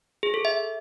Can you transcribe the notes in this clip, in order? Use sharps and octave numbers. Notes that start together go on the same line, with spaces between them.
G#4
A4
E5